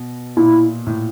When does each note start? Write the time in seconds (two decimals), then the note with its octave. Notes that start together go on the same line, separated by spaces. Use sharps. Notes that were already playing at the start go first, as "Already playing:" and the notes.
Already playing: B2
0.37 A#2 E4
0.87 A2